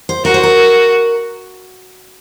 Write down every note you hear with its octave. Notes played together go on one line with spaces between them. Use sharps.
C5
F#4 A#4
C5
A#4